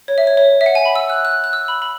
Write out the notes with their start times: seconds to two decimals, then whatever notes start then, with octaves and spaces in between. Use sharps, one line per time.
0.08 C#5
0.18 E5
0.27 C#5
0.37 C#5
0.61 E5
0.66 F#5
0.75 G#5
0.85 B5
0.95 E6
1.10 F#6
1.25 F#6
1.44 F#6
1.53 E6
1.68 B5
1.82 B5